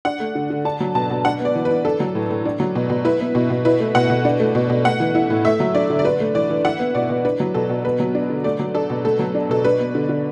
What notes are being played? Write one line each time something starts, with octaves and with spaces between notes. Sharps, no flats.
D4 F#5
A3
D3
D3
D4 A5
F#3
B2 A5
B2
D4 F#5
B3
D5
E3
B4
E3
D4 A4
F#3
A2
A2
D4
F#3
B2
B2
E4 B4
B3
B2
B2
E4 B4
A3
B2 F#5
B2
D4
A3
B2
B2
A3 F#5
E3
E4
A2
A3 E5
F#3
D4 D5
D3
D5
D4 B4
A3
E3 D5
E3
E4 F#5
B3
B2 D5
B2
D4 B4
F#3
B2 A4
B2
B3 B4
F#3
D4
D3
A3 D5
F#3
D4 A4
B2
A3 A4
F#3
D4
B2 A4
D4 B4
B3
D3
D3